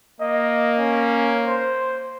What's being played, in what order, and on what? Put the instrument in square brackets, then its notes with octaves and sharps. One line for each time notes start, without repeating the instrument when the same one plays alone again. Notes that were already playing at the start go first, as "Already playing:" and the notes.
[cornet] A#3 [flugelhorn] D#5
[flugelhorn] C#4
C5